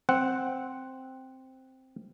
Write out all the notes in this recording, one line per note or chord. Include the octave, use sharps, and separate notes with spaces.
C4 F#5